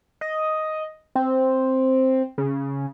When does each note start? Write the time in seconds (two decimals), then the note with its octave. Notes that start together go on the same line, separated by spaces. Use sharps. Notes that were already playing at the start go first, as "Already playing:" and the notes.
0.21 D#5
1.15 C4
2.38 C#3